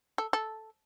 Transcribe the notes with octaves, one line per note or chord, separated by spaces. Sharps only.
A4
A4